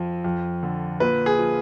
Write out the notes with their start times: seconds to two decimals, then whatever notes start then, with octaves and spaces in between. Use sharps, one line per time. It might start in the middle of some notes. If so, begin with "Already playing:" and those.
Already playing: F2 F3
0.25 F2
0.63 D3
1.00 A#2 B4
1.26 G#4
1.39 F3